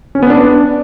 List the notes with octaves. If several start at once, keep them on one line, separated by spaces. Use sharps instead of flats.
C#4
B3
D4